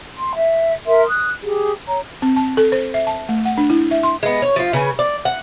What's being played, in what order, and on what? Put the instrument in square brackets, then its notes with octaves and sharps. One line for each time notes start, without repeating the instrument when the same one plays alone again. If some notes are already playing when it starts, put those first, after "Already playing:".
[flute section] C6
E5
A#4 E5 C6
D#6 F#6
G4 G#4
C#5 A#5
[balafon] C4
A5
A4
C5
E5
A5
A3
F#5
D4
E4
E5
C6
[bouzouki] G#3 B3
C#5
F3 F4
C#3 B4 G#5
D5
F#5